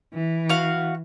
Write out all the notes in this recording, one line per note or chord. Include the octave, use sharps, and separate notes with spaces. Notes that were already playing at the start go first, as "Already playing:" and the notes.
E3
F#4 F5